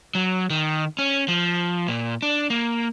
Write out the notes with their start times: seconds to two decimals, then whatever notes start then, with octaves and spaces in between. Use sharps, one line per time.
0.15 F#3
0.50 D#3
0.99 C#4
1.28 F3
1.88 A#2
2.22 D4
2.50 A#3